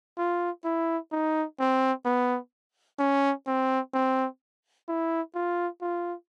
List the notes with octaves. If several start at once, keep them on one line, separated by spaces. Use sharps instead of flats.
F4
E4
D#4
C4
B3
C#4
C4
C4
E4
F4
F4